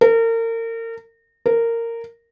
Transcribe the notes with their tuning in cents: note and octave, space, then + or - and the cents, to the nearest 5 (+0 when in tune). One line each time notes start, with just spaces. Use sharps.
A#4 -35
A#4 -15